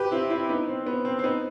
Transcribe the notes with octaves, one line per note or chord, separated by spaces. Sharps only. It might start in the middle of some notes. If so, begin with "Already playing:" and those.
Already playing: G4 B4
C4 E4
C4 E4
B3 D#4
C4
B3
C4
C4
B3 D#4